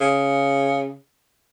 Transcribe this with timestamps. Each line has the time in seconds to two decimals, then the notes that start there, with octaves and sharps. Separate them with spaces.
0.01 C#3